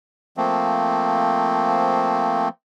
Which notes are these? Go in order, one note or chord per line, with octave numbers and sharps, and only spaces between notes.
F3 A3 A#3 C4